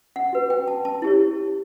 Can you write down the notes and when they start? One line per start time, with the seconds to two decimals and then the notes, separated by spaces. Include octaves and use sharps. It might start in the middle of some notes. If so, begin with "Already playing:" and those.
0.16 F#5
0.33 F#4 B4
0.50 G5
0.68 A5
0.85 A5
1.02 E4 G4 C#5